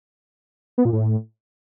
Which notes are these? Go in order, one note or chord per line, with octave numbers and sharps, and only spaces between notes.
B3
A#2
A2